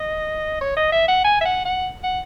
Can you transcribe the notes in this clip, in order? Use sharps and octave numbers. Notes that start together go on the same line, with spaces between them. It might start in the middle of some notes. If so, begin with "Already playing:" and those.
Already playing: D#5
C#5
D#5
E5
F#5
G#5
E5
F#5
F#5
F#5